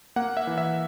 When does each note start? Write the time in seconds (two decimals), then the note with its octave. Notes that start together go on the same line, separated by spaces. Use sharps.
0.16 A#3 F#5
0.37 E5
0.47 E3
0.58 E5